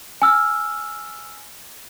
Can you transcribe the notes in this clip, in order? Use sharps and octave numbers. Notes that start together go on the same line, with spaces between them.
G#5 E6 F6